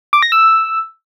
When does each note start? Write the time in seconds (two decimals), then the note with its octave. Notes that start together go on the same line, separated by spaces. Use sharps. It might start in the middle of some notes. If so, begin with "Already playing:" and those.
0.13 D6
0.22 A#6
0.32 E6